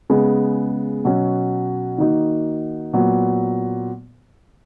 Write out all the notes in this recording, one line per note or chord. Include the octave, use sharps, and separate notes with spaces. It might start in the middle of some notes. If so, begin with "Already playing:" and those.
C#3 G#3 B3
B2 F#3 C#4 F#4
D#3 A#3 D#4 F#4
A#2 F#3 B3